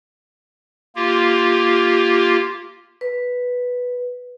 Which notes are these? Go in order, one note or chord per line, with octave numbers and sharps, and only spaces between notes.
A#3 F4 G4
B4